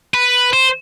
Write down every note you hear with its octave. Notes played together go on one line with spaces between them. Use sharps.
B4
C5